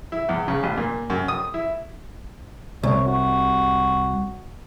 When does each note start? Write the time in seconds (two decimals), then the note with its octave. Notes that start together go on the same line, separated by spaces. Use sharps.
0.12 E4
0.29 E2
0.48 C#3
0.63 A1
0.77 A#2
1.10 F#2
1.28 D#6
1.54 E4
2.83 C2 C#5
3.07 F#4